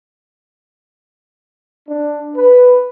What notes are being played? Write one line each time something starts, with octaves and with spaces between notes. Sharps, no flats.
D4
B4